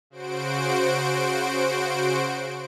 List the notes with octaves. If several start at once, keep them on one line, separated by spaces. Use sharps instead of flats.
C#3 F#4 C5 D7